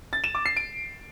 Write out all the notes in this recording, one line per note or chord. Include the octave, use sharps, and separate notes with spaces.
A6
E7
D6
C7
D7